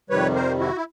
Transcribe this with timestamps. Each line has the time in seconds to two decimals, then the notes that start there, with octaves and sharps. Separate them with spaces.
0.10 F2 C3 D#3 G3 B4 C#5
0.35 A#4 C5
0.59 E4 F#4
0.76 E4